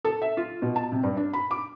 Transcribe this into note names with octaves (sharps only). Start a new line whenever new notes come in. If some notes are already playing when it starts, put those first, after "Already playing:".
A4
E5
F4
B2
A5
C3
G2
D4
B5
D6